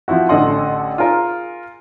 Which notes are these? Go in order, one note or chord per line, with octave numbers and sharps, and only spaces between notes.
F3 C4 E4 F#4
A1 D3 A4 D#5 F#5 C6
F4 G#4 A#4